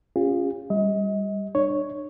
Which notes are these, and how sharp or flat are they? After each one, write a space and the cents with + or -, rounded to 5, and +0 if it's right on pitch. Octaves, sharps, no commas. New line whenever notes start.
C#4 +0 F4 +10 G#4 -40
G3 +15 D#5 +35
D4 +40 C#5 +0